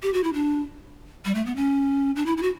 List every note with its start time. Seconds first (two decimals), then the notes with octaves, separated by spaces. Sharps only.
0.03 G4
0.14 F#4
0.24 E4
0.33 D4
1.25 G3
1.35 A3
1.46 B3
1.56 C#4
2.16 D4
2.26 E4
2.37 E4
2.42 F#4